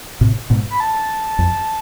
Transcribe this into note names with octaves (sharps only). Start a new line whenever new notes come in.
A2 C3
G#2 B2
B5
A5
F2